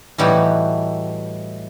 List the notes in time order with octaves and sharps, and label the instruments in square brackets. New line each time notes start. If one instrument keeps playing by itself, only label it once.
[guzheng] A2 E3 G3 D#4 F#4